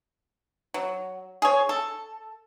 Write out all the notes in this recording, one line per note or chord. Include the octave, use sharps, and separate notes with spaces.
F#3
G#4 C#5
A4